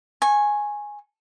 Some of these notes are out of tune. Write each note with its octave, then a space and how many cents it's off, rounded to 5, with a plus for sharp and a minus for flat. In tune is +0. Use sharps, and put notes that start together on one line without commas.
G#5 +0 C#6 -25